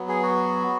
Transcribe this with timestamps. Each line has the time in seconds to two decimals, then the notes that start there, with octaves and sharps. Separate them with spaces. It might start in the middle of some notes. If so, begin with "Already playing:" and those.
Already playing: F#3 B3
0.09 G#4
0.23 F#4